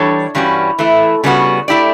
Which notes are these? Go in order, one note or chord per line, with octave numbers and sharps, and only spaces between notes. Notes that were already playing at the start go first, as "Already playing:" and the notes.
Already playing: E3 G3 D4 A4 C#5
G2 E3 G3 C#4 F#4
E3 A3 E4
C#3 G3 B3 F#4
A3 E4 G4 D5